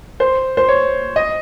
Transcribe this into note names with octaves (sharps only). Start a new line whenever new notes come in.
C5
C5
C#5
D#5